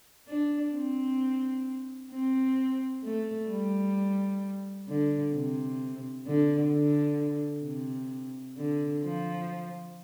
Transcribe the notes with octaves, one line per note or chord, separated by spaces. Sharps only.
D4
C4
C4
A3
G3
D3
C3
D3
D3
C3
D3
F3